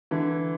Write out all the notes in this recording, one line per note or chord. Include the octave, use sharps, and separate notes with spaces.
D3 E3